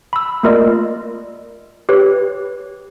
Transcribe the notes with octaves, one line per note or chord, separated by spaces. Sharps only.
B5 E6
A3 A#3 F4 A#4 D5 D#5
G4 B4 C#5